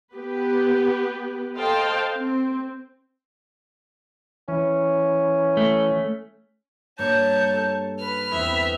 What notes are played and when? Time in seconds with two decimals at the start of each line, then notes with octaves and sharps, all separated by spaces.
0.15 B3 G4 B4
1.57 A4 C5 D#5 F5 G5 A5
2.16 C4
4.48 E3 C#4
5.57 A3
6.99 G2 A#3 C#5 A5 G6
7.53 A4
7.99 B4 F6
8.32 E2 C4 E5